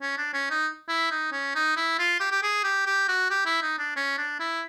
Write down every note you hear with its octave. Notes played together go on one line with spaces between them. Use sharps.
C#4
D4
C#4
D#4
E4
D#4
C#4
D#4
E4
F4
G4
G4
G#4
G4
G4
F#4
G4
E4
D#4
D4
C#4
D4
E4